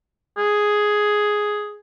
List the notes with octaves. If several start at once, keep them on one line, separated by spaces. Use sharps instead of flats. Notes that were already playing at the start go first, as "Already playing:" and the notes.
G#4